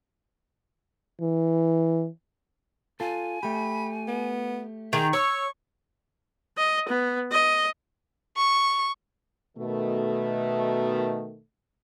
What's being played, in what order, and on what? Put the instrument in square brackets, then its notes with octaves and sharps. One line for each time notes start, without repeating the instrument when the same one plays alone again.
[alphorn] E3
[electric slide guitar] F4 A4 [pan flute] G#5
[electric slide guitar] A3 G4 [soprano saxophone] B5
[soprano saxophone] B3
[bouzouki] D#3 [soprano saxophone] G#4 [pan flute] A#5
[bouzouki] C#5 [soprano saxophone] C#6 [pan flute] E6
[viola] D#5
B3
D#5
[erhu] C#6
[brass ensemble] B2 D#3 A3